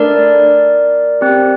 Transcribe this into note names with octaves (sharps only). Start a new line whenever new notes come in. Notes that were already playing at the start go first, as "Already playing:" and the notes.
Already playing: A3 D4 A4 A#4 D5
C4 G4